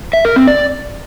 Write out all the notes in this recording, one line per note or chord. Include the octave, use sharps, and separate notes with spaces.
E5
A#4
C4
D5